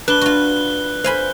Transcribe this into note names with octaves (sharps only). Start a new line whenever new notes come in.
D4 B4 F#6 G7
F4 F#4
C5 F5 G#5 B5